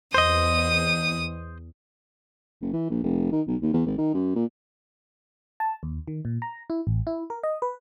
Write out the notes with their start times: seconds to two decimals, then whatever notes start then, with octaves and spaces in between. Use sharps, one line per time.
0.14 E2 C5 D#5 D#6
2.61 F#1
2.73 E3
2.90 A#1
3.04 F1
3.32 D#3
3.47 B1
3.62 D#2
3.73 E2
3.86 G#1
3.98 D#3
4.14 F#2
4.35 A#2
5.60 A5
5.83 D#2
6.08 D#3
6.25 A#2
6.42 A#5
6.70 E4
6.87 A1
7.07 E4
7.30 A#4
7.43 D#5
7.62 B4